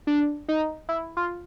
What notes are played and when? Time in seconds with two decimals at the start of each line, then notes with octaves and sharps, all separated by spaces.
0.07 D4
0.48 D#4
0.89 E4
1.17 F4